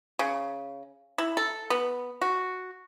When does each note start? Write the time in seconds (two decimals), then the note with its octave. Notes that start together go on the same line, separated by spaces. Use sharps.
0.19 C#3
1.18 E4
1.37 A4
1.70 B3
2.22 F#4